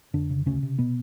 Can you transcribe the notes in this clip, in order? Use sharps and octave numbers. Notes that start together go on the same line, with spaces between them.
F2 D3 D4
C#3
D2 C#3 C#4
C3
B2 B3